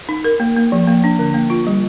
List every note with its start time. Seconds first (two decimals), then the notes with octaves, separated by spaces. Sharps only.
0.09 D#4
0.24 A#4
0.40 A#3
0.56 A#3
0.72 F3
0.87 A#3
1.04 D4
1.19 D3
1.34 A#3
1.50 F4
1.67 G3